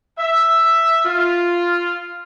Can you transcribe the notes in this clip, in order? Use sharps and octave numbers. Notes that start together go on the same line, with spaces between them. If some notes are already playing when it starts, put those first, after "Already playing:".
E5
F4